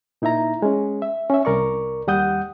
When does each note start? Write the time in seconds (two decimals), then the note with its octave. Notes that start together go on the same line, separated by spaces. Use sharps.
0.22 A#2 D#4 E4 E5 A#5
0.62 G#3 C#4
1.02 E5
1.30 C#4 E5
1.45 C2 A#4 D5 C#6
2.07 D#2 G3 F#5 D#6 G6